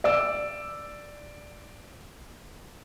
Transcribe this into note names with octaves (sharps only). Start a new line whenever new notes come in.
D5 D6 E6